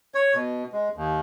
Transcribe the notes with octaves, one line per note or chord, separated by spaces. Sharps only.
C#5
B2
G#3
D#2